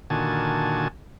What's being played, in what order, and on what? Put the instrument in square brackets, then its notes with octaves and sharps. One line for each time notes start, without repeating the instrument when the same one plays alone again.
[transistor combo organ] A#2 D3 D#3 F#4 G#5 A5